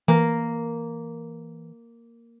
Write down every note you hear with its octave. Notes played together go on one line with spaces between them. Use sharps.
E3 A#3